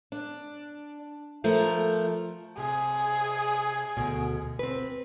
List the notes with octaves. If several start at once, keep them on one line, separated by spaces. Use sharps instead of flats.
D4
F3 A3 A#4
C3 G#4
D2 B2
C4 B4